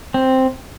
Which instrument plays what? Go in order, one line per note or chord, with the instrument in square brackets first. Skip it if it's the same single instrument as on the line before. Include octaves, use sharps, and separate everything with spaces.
[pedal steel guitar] C4